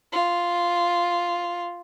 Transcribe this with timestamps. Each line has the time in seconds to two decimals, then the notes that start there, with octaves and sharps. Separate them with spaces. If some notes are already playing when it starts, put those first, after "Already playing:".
0.13 F4